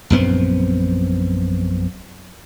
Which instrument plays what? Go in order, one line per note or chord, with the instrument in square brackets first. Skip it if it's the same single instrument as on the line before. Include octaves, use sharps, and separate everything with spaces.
[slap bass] A#1 F#2 B3 C4